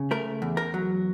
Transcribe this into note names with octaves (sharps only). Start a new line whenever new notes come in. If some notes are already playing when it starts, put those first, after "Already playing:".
Already playing: C#3
A3 A#4
E2
A#4
F#3